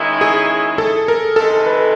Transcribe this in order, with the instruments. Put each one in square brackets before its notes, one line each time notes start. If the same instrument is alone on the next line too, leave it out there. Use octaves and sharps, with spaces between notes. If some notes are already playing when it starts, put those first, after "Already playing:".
Already playing: [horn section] D#3 G#3 C#4 E4
[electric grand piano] G#4
A4
A#4
[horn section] C3 D#3 G#3 [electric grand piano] A4
[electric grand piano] B4